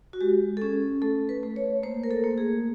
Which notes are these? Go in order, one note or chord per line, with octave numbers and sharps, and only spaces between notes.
F#4
G#3 G4
A4
C#4 G#4
A3 A4
B4
A3
C#5
A#3 C5
A#4
A4
A#3
G#4